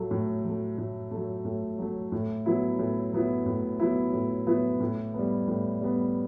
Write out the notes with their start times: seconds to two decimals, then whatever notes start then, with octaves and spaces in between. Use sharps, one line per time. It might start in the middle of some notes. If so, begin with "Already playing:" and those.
Already playing: A2 F#3 A3
0.11 A2
0.44 F#3 A3
0.78 A2
1.11 F#3 A3
1.45 A2
1.79 F#3 A3
2.12 A2
2.46 F#3 B3 E4
2.79 A2
3.13 F#3 B3 E4
3.46 A2
3.79 F#3 B3 E4
4.13 A2
4.47 F#3 B3 E4
4.80 A2
5.14 G3 B3
5.47 A2
5.81 G3 B3